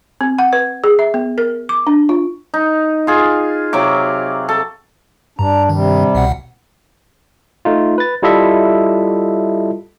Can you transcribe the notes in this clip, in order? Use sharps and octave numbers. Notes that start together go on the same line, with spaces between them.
C4
F#5
B4
G#4
E5
B3
A#4
D6
D4
F4
D#4
F4 G#4
C3 F#3 F5 D6
A4
G2 D4 A#5
C3 D#3 G3
C2 B2 F#5
A3 D#4 F4
B4 A6
G3 E4 F4 A4 D#5 E5